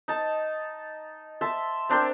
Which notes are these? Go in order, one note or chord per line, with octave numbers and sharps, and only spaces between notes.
D#4 A5
E5 A5 C6
C4 D4 A#4 G5